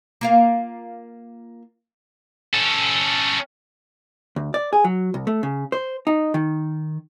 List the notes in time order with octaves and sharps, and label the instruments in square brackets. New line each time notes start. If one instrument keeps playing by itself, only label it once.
[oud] A#3 F4 F5
[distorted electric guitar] C#4 A4
[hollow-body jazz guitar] D2
D5
G#4
F#3
C2
A3
C#3
C5
D#4
D#3